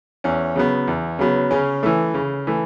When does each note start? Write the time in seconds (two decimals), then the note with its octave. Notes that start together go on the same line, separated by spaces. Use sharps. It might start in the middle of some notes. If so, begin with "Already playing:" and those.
0.24 E2 C#4
0.56 C#3 F#3 B3
0.88 E2
1.19 C#3 F#3 B3
1.51 C#3 C#4
1.83 E3 A3
2.14 C#3
2.47 E3 A3